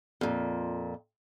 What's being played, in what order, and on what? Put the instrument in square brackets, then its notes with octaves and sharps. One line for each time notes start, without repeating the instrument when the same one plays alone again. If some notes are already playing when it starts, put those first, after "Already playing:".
[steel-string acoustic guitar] F2 A#2